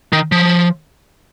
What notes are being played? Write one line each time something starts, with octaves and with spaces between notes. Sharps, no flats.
D#3
F3